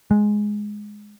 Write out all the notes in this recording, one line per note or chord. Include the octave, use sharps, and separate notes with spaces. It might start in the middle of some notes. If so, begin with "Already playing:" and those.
G#3